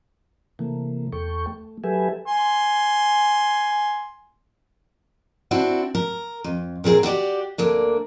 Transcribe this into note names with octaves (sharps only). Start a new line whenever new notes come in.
C3 E3 A3 A#3
E2 A4 G5 C#6
A3
F#3 G4 A4 B4 E5 G#5
G#5 C6
C4 D4 E4 F#4
A#4
F2
A#2 C4 G#4 A#4
F#4 G4 C#5 D5
D2 A#3 D4